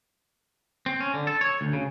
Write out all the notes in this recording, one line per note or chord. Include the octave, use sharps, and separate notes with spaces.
C4
C#4
D3
A4
C#5
D2
C#3